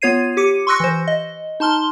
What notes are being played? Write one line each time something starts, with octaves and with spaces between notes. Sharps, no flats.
B3 F4 C#5 G#6 C7 D#7
G4 D6 C#7 D#7
C6 C#6 E6 F#6 A#6 C#7
E3 C5
D#5
D#4 A5 C6 F6 G7